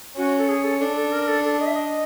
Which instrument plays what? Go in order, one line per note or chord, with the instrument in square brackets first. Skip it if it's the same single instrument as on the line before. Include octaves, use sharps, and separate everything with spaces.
[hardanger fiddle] C#4 [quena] F#4
[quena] A4
G#4
A4
[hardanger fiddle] D4 [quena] A4
[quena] A4
A#4
A4
A4
D#5
E5
D#5